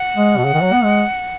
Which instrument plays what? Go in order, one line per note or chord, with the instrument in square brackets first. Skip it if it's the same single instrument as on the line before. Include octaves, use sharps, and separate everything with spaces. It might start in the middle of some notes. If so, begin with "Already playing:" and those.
Already playing: [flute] F#5
[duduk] G#3
B2
C#3
D#3
F#3
B3
G#3